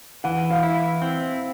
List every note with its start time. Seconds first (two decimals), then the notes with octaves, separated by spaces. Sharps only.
0.24 E3 F#5
0.51 F5
0.63 E4
1.02 C4